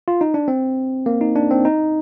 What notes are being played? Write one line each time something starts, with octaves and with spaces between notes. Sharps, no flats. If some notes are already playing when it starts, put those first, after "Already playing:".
F4
D#4
D4
C4
A#3
D#4
D4
C4
D#4